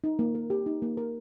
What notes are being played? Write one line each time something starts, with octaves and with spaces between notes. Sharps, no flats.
D#4
A#3
A#4
G4
D#4
A#3
A#4